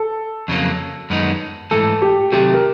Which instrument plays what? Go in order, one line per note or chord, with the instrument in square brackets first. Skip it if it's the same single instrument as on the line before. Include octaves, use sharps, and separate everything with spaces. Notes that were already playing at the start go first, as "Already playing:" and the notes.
Already playing: [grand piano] A4
[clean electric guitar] F2 C#3 F#3 A#3
F#2 D#3 G#3 B3 D#4
[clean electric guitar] G#2 E3 A3 [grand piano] A4
[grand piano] G4
[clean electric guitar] C3 D#3 F#3 A3 [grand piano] G4
[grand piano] A#4